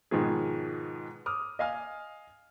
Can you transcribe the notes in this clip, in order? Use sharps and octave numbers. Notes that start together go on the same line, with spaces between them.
G#2 B2 D#3 F3 B3 G#4
D6 D#6 F6
D#5 F5 G#5 F6